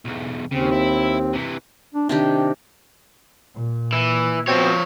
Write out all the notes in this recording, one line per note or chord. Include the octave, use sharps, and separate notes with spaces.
B1 E2
D#2 C#3 C4
E4
C3 E3
D4
C3 D#3 D4 G4
A#2
E3
B2 F3 C4 C#5